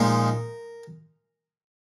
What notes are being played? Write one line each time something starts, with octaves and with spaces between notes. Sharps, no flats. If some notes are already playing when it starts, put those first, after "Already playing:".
Already playing: A#2 F3 G#3 D#4 A#4